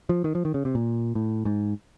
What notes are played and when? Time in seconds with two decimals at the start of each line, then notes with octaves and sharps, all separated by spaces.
0.09 F3
0.24 D#3
0.35 F3
0.45 D#3
0.54 C#3
0.65 C3
0.75 A#2
1.15 A2
1.45 G#2